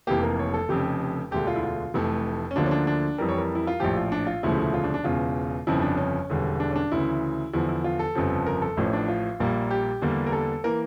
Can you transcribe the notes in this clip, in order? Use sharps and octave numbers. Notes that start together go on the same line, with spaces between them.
F1 F2 E3 A#3 G4
A#4
C#5
A4
F1 F2 C#3 G4
E1 D2 D3 G4
F4
E4
F4
F1 F2 E3 A3
C#4
D2 D3 F3 A#3 D4
C#4
D4
D4
F2 E3 G3 A#4
C#5
A#4
E4
F4
A#1 A2 F3 G4
F4
D4
F4
E1 D2 C#3 F3 A3 E4
E4
F4
D4
D4
E1 E2 C#3 F4
G1 F2 C#3 F3 E4
D4
C#4
E1 E2 D3 G3
D4
C#4
D4
D2 C#3 E3 E4
E2 D3 F3 E4
E4
F4
A4
G1 F2 C#3 F3
A#4
A4
A1 A2 F3 C#4
D4
F4
A#1 A#2 G3 A#3
G4
E2 D3 G3 A#3
A#4
A4
E3 A#3 A#4